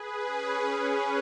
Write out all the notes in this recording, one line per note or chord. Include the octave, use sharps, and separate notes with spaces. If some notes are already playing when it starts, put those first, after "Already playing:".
Already playing: G#4 B4
C#4